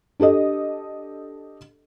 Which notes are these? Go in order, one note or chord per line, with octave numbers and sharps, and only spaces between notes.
D4 G4 A4 D#5